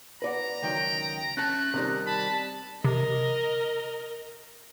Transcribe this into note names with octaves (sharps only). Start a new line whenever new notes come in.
B4 D5 F#5 A#5
C#2 D#3 F#3 G5
A3 C#4 A5 F#6
C3 D#3 G3 D#5
A5 B5
C3 A#4 D#5